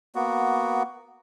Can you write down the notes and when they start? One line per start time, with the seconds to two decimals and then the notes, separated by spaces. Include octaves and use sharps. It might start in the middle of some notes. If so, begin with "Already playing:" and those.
0.15 A#3 B3 F#4